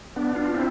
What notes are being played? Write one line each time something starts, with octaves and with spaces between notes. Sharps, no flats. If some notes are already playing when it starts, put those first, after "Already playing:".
B3 D4
D4 F4
C4 E4